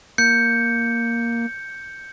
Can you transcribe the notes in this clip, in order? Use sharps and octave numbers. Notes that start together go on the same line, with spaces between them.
A#3 G6 C#7